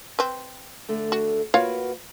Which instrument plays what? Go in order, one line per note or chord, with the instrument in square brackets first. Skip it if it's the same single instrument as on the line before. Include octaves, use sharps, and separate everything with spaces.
[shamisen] C4 B4
[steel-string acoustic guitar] D3 A3
[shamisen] F#4
[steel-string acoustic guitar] A#3 F#4 B4 [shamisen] F4 C#5 F5